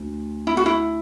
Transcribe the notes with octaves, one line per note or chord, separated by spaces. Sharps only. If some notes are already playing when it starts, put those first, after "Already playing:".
Already playing: D2
E4
F#4
E4